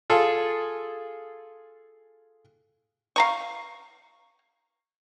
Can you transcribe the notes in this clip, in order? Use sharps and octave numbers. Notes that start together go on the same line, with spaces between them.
F4 G#4 A4
F5 A#5 C#6